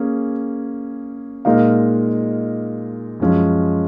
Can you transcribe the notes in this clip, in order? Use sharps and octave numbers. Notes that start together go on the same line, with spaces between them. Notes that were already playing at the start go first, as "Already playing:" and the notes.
Already playing: A#3 C#4 G#4
A#2 G#3 D#4 A#4 F5
F#2 F3 G#3 C#4 F4